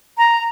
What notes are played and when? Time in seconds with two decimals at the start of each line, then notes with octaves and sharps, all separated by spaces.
0.18 A#5